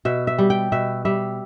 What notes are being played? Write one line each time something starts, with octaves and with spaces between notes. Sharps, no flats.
B2 E5
E5
G3
G5
B2 E5
G3 E5